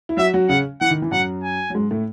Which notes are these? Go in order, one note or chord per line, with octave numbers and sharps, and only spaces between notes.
E4
F#3 F#4 E5
F#3 F#4
C#3 C#4 F#5
E3 F#5
D#3
E3
F#2 F#3 F#5
G#5
F#3
G#2 G#3
A2 A3